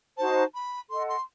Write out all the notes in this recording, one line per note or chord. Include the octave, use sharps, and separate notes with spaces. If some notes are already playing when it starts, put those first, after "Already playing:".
D#4 F#4 C5 A5
B5
A4 D#5 F#5 C6
C6